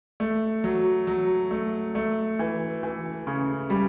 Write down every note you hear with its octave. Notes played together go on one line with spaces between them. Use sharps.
A3
F#3
F#3
A3
A3
E3
E3
C#3
G3